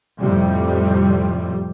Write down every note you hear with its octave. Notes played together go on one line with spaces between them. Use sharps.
F2 A2 C3 G3